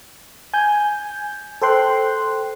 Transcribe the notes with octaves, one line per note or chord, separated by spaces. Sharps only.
G#5 G6
A4 C5 G5 C6 F#6